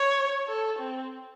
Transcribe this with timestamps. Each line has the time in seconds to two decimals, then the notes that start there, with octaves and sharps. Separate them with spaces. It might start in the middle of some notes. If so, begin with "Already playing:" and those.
Already playing: C#5
0.48 A4
0.79 C4